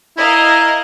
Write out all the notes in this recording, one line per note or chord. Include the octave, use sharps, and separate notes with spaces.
E4 A#4 D#5 F5